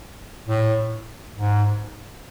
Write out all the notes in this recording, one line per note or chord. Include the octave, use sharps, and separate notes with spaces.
A2
G#2